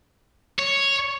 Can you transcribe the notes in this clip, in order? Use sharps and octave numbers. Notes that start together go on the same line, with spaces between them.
C#5